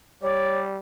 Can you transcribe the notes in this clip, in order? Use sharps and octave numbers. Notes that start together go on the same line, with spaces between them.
G3 C#5 D5